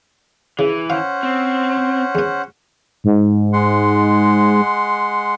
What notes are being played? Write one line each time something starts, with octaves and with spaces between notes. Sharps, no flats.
C#3 E3
C#4 C5 F5 F#5
C4
E2 B3
G#2
G#3 F#5 C6